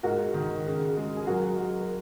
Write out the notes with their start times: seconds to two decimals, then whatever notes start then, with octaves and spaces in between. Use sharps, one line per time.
0.03 G#2 F#4 A#4
0.34 D#3
0.66 C#3
0.97 G#3
1.17 G#4
1.27 F#3 F#4 A#4
1.58 F#3
1.81 A#4